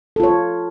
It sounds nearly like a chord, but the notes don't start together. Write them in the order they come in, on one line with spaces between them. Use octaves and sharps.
A4 F4 C#5